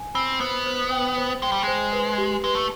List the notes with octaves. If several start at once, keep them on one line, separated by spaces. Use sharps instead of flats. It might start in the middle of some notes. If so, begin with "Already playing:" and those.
Already playing: G#5
C4 B5
B3 C5
C5
G5
C5
G#3 G5
G3
G#3
C5
B4
G4
G#3 B4
A3